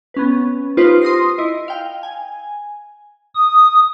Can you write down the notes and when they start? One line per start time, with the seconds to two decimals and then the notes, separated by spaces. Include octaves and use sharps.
0.14 B3 C#4 B4
0.77 D#4 F4 G4 B4 C5 C6
1.01 C6 D#6 A#6 C7
1.38 E4 D#5
1.68 F5 G5
2.03 G#5
3.35 D#6